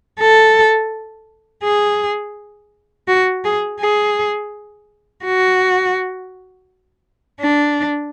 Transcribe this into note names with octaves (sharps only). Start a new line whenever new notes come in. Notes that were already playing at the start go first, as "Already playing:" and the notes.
A4
G#4
F#4
G#4
G#4
F#4
D4